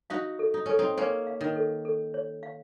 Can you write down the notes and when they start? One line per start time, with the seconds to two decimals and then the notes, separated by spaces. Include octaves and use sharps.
0.10 D#4 F#4 F5
0.39 A4
0.54 D#4
0.66 C#4 A4
0.79 C4 D#4
0.98 A#3 C#4 C#5
1.27 F5
1.41 D#3
1.56 A4
1.85 A4
2.14 C#5
2.43 F5